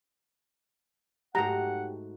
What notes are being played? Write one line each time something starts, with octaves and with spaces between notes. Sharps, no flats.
G#2 A3 F#4 G4 C5 F#5 A#5